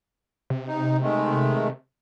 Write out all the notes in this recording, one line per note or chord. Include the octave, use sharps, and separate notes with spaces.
C3
D#4
D#3 G#3 A3